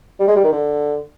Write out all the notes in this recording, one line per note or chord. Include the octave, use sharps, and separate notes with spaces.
G3
G#3
G3
D#3
D3